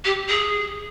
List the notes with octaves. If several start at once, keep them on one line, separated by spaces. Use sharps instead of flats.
G4
G#4